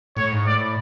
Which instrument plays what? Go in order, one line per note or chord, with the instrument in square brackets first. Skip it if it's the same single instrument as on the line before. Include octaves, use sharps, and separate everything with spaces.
[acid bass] A2 [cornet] C#5
[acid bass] G#2
[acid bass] A2 [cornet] D5